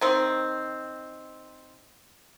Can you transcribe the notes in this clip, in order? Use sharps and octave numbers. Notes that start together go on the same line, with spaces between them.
D#3 C4